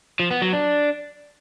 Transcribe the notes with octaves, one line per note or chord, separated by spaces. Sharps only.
F3
B3
F#3
D4